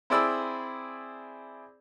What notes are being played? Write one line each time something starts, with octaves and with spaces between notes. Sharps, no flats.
C4 E4 G#4 D5 B5 E6